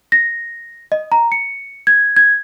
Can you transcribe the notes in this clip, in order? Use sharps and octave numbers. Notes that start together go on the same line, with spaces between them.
A#6
D#5
A#5
C#7
G#6
G#6